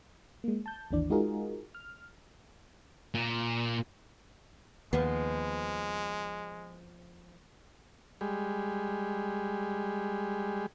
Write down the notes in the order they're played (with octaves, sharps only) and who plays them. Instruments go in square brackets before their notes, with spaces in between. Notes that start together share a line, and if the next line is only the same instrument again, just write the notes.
[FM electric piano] G#3 A#3
A5 G6
G#1 D#2 E3 D4 D5
G#3 D#4 F4 F#4 G#4 A#4
F6
[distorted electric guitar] A#2
[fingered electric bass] D#2 [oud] F3 B3 [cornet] G#3
[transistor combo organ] G3 G#3